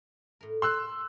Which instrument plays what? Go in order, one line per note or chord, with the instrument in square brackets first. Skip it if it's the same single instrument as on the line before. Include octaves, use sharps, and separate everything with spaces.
[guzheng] A2 A#4
[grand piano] C6 E6 F#6